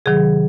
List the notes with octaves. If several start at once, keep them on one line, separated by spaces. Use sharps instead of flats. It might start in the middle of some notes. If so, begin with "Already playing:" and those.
C3 D#3 F#3 G#4